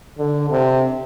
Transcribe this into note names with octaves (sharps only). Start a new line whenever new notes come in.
D3
C3